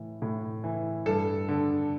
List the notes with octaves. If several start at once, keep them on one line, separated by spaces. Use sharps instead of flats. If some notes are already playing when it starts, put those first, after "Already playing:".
Already playing: A2 E3
A2
E3
G2 A4
D3